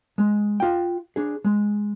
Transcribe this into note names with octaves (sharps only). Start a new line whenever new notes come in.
G#3
F4 G5
D4 G#4
G#3